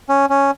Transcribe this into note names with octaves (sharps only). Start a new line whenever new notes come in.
C#4
C#4